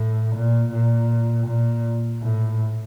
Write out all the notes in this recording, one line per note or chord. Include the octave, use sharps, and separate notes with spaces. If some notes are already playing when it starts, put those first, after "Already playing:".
Already playing: A2
A#2
A#2
A#2
A2